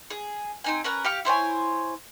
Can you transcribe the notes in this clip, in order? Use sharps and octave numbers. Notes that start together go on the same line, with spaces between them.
G#4
C4 D#4 G#5
C#4 A#4 B4 A#5
G4 F5 C#6
E4 C5 C#5 G#5